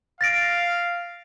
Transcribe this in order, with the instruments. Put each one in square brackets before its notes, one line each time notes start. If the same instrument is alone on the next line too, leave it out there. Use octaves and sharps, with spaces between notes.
[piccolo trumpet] F5 [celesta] A6 A#6 D7